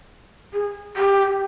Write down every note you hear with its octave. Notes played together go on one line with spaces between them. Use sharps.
G#4
G4